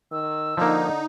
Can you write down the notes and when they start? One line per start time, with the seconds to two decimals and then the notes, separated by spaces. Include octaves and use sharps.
0.12 D#3 E6
0.57 D3 F3 A#3 D#4